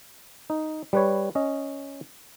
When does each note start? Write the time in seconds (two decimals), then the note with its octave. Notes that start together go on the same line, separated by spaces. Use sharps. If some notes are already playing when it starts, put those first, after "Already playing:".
0.50 D#4
0.93 G3 B4 C#5
1.35 C#4 D#5